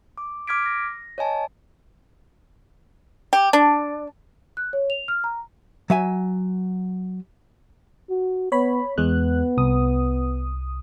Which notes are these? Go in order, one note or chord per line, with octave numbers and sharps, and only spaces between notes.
D6
D6 F6 G#6 B6 D7
A#6
C#5 D#5 G#5 A5
G4
D4
F#6
C#5
F7
F6
A#5
F#3 E5 G#5
F#4
B3 C#5 B5
E2 G#3 B3 F#6
C2 D#6